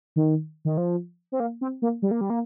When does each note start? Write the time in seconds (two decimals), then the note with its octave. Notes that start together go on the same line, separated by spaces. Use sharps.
0.16 D#3
0.65 D#3
0.77 F3
1.32 C4
1.40 A#3
1.61 C4
1.82 A#3
2.02 G3
2.11 A#3
2.21 G3
2.30 A#3